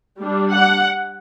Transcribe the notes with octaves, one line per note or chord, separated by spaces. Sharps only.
G3 D4
F#5